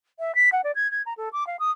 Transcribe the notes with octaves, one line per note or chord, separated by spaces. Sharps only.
E5
B6
F#5
D5
G#6
G#6
A#5
A4
D6
F5
D#6